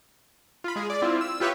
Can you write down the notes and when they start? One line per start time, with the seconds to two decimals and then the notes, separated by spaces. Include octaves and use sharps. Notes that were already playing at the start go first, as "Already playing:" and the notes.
0.64 F4 B5
0.76 G#3 G#4
0.90 D5
1.02 C4 E4 F4
1.21 E6
1.40 F4 G4 B4 C#5 E5